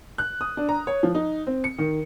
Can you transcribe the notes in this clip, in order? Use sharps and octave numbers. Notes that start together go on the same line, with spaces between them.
F#6
D#6
D4
A#5
C#5
F3
D#4
C4
C#7
D#3